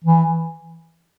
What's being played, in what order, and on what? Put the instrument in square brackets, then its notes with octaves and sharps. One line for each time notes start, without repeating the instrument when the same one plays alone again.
[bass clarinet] E3